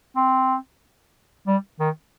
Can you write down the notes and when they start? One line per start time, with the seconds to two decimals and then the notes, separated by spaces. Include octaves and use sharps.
0.16 C4
1.47 G3
1.80 D#3